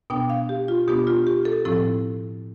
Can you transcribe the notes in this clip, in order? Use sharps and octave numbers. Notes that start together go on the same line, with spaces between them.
B2 B3 D4 G5
F5
G4
F4
B2 B3 D4 G4
F4
G4
A4
A2 F3 C4 E4 A4